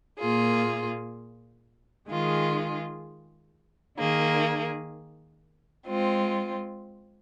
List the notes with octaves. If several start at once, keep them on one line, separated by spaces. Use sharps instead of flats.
A#2 A#3 F4 G#4
D#3 G#3 F4 G#4
D#3 A#3 G#4
G#3 C4 F4